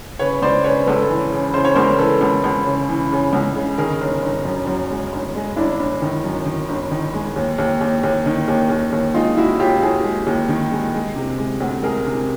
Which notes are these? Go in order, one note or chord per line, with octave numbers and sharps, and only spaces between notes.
C#3 B4 C#5
C#2 C5 D5
C#3 B4 C#5
C#2 A4 B4
E3
C#3
C#3 C5
C#5
C#2 A#4 C5
E3 A4 B4
C#2
C#2
C#3
E3
C#3
C#2
C#3
D#3 G#4 A#4
G1
G1
F#2
F#2
G#3
G1
G#3
G1 D4 E4
G1
D#3
F#2
D#3
G1
D#3
G#3
D#2
D#2
D#2
D#2
D#3
D#2
D#2
D#2
G#3 D#4 F4
G#3 E4 F#4
D#2 F4 G4
D#2 F#4 G#4
G#3
D#2
D#3
G#3
G#3
C3
G#3
D2
G#3 G#4 A#4
C3